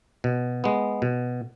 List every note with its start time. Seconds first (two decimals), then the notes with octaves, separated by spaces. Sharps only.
0.24 B2
0.64 G#3 B3
1.02 B2